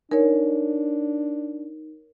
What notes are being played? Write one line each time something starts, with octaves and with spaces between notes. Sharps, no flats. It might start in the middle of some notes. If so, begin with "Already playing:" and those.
D4 D#4 A#4 C#5